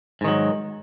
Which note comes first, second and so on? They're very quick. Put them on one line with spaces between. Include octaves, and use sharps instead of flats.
G#2 D#3 F#3